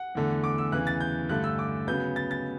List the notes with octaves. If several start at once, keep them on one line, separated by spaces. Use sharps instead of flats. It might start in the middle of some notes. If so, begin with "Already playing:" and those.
Already playing: F#5
E2 D3 A3
D6
E6
E2 C#3 E3 F#6
A6
G6
G2 D3 A3 F#6
E6
D6
C#3 F#3 B3 G6
A6
A6